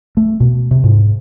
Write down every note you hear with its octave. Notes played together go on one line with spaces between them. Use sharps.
A3
B2
C3
G#2